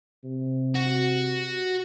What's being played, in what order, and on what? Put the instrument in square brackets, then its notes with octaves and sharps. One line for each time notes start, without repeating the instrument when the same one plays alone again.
[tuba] C3
[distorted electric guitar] F#4